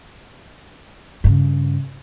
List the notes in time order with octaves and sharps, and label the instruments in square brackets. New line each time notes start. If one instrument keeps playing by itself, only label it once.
[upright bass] G2 C#3